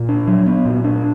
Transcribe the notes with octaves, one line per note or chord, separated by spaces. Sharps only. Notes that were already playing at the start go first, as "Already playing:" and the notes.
Already playing: A#2
D4
F#3
B3
A#2
D4